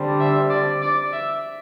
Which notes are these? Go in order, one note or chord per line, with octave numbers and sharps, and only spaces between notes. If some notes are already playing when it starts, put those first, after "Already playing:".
Already playing: D3 G3 C4
E5
D5
D5
E5